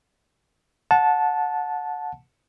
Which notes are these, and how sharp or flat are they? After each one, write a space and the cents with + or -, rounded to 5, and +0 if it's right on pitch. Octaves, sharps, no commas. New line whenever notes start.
F#5 -25 A5 -10